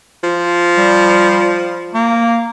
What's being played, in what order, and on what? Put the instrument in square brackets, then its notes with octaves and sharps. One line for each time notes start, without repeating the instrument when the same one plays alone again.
[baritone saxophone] F3
[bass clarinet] G3
A#3